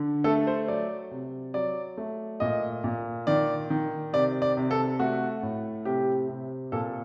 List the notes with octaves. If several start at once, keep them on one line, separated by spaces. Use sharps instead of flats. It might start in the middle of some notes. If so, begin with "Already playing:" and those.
Already playing: D3
A3 A4
C5
F#3 D5
C3
F#3 D5
A3
A#2 D#5
A#2
D#3 D5
D#3
C3 D5
D5
C3
A4
A3 F#4
A2
C3 G4
C3
A#2 A4